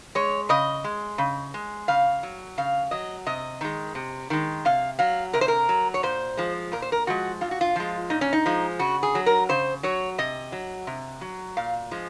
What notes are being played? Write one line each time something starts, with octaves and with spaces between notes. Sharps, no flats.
G#3 C#5
C#3 D#5
G#3
C#3
G#3
C#3 F5
F#3
C#3 F5
F#3 D#5
C3 D#5
D#3 G#3
C3
D#3 G#3
C3 F5
F#3 F5
C3 A#4
C5
A#4
F#3
C#5
A#2 C5
F3 G#3
A#2 A#4
C5
A#4
F3 G#3 F#4
A#2 F4
F#4
F4
F3 G#3
A#2 D#4
C#4
D#4
F3 G#3
C#3 F#4
G#4
F#3
A#4
C#3 C5
F#3 C#5
C3 D#5
F#3
C3
F#3
A#2 F5
F3 G#3